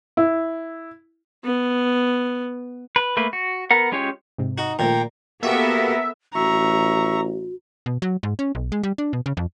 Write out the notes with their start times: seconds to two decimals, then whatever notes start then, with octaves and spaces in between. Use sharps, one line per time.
0.17 E4
1.44 B3
2.96 B4
3.17 A3 A#3 B4
3.33 F#4
3.71 B3 A#4 F#5
3.92 G#3 C#4 F4 G4 C#5
4.38 G#2 C3
4.58 D#4 F#4
4.79 A#2 D#3 F3 A3 G5 A#5
5.43 A#3 B3 F#4 G4 A4 A#4 E5
6.35 A1 F#4 E5 A#5 C#6
7.86 B2
8.02 F#3
8.23 G#2
8.39 C#4
8.55 B1
8.72 G#3
8.83 G3
8.98 D4
9.13 B2
9.26 C#3
9.37 F2